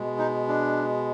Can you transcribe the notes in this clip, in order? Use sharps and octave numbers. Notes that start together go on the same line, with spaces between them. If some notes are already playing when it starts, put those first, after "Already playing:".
Already playing: B2 G#3
D#4
D4